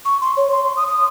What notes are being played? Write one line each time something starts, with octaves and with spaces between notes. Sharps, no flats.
C#6
C6
C#5
C6
D#6
D#6